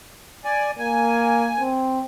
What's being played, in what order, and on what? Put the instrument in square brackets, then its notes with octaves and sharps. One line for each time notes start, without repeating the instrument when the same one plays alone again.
[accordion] D5 G#5
[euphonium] A#3 [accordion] G#5
[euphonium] C4